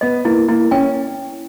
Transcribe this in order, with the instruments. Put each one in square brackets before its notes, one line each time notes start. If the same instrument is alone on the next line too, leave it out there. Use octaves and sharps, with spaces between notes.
[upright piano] B3 [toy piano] D#5
[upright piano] A#3 [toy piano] E4
[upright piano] A#3 [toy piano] E4
[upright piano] C#4 [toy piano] G5